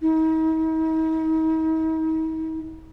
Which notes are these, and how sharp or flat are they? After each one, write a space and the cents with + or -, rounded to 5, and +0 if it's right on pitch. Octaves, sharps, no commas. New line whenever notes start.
D#4 +45